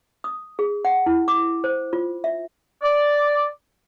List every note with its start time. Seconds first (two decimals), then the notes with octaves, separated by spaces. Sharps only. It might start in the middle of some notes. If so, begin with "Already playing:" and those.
0.24 D#6
0.59 G#4
0.85 F#5
1.06 E4
1.28 D6
1.64 C5
1.93 F4
2.24 E5
2.82 D5